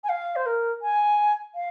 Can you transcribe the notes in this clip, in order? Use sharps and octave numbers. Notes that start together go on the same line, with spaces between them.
G#5
F5
C5
A#4
G#5
F5